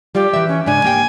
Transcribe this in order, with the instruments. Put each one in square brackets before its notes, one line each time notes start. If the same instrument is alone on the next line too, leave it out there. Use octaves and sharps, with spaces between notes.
[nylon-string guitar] G3 F4 D5 [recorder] G4
[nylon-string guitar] E3 E5
[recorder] C#4
[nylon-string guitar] G#2 C#3 D4 [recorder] G#5
[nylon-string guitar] A#3 G4 G5